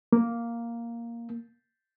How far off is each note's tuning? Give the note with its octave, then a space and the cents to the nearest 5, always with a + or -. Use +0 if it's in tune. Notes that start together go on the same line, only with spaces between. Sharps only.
A#3 +0